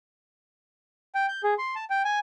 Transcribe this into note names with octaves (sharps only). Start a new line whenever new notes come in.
G5
G6
G#4
C6
A5
G5
G#5